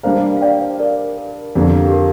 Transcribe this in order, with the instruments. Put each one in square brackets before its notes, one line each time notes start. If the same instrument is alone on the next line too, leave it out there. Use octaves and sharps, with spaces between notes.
[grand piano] G3 A#3 D4 A#4 [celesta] C5 F5
[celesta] F5
D5 G5
C5 F5
A#4 D5
A#4
[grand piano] F2 D3 A#3 [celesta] G4
[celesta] G4
A#4